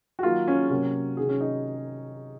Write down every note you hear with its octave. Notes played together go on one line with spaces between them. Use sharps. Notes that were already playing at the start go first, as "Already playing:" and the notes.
F#4
D#3 F#3 A#3 F4
C#4
C3 F#3 A#3 C#4
C3 D#3 F#3 G#4
C#4
D#4